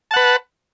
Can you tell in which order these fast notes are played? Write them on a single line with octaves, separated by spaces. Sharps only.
A5 F#5 B4